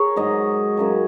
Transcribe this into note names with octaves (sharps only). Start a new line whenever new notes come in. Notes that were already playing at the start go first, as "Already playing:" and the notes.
Already playing: G#4 A#4 C#5
G#2 F#3 D#5
F#2 C#3 F#3